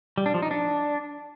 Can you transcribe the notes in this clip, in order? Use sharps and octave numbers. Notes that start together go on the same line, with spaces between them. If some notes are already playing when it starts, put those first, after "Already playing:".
G3
D4
F3
D#4
D4